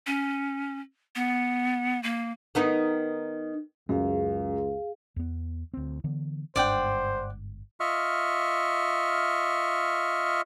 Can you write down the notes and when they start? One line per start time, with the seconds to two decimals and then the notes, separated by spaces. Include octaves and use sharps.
0.06 C#4
1.16 B3
2.03 A#3
2.55 D#3 B3 D#4
3.89 C#2 F#2 G#4 F5
5.16 E2 B3
5.74 D2 C4
6.04 D3 E3 B3
6.56 G1 G#2 D4 C5 D5 F#5 G5
7.80 F4 D#5 E5 C#6 F6